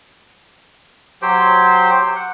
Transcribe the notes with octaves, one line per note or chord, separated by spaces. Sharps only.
F#3 G4 C5 G5
F#5